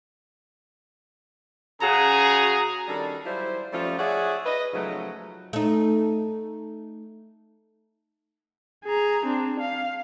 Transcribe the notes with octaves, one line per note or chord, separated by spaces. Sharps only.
C#3 F#4 G#4 A#5
D#3 G3 C#4 D4 A4
F#3 G3 E4 F4 C5
F3 G3 A3 C#4 F4
G#4 C#5 D5 E5 F#5
B4 D#5
G#2 C#3 F3 F#3 A3
A3 D#4
G#4 A#5
C4 D4
F5